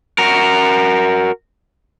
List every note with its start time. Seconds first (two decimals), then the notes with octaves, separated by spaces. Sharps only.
0.18 F#4 A#4